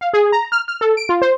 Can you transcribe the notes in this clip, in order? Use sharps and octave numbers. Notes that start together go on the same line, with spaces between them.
F5
G#4
A#5
F6
F6
A4
D7
F4
C5